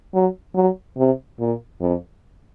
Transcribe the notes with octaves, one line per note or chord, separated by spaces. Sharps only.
F#3
F#3
C3
A#2
F2